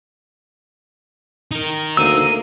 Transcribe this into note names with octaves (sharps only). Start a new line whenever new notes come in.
D#4 A#4
D2 A#3 E6 D#7